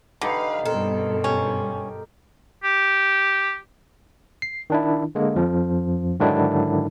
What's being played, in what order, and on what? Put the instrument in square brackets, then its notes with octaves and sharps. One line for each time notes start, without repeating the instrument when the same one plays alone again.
[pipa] D3 [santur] D#4 G4 [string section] B4 F5
[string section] G2 B2 [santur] C4 A#4 [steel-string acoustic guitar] A4
[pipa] C#4 [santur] G4
[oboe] G4
[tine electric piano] C7
D#3 D4 E4
D3 G#3 A#3
F2 F3
G#2 D3 D#3 F#3 D4 E4